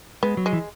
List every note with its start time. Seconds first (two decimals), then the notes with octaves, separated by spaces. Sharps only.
0.23 G#3 B3
0.37 F#3
0.46 G#3
0.53 E3